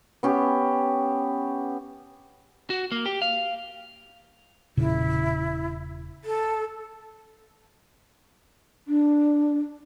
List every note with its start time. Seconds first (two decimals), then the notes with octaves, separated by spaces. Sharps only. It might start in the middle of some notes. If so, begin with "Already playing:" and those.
0.23 B3 C#4 G4
2.70 F#4
2.92 A#3
3.06 G4
3.22 F5
4.77 E1 A#2 C#3 E4
6.24 A4
8.88 D4